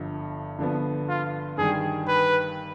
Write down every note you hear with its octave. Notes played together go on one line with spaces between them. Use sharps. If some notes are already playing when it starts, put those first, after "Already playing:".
Already playing: G1 G2 F3
G2 D3 F3 B3
F4
G2 D#3 G3 G#4
B4